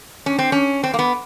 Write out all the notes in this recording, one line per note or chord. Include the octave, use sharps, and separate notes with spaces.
C#4
C4
C#4
C4
A#3
B3